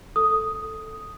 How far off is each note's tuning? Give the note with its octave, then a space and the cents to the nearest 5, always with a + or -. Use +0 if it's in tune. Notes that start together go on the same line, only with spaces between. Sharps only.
A4 +0 D#6 +0